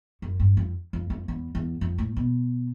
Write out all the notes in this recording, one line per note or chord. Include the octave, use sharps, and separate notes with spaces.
F#2
G2
F2
F2
F2
E2
E2
F2
A2
B2